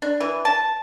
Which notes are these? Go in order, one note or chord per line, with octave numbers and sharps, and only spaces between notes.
D4
E3
A5